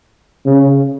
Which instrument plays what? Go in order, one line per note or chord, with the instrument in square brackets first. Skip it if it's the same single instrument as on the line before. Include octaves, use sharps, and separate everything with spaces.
[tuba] C#3